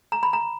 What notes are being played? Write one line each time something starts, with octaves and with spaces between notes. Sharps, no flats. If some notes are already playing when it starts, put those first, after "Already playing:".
A#5
B5
A#5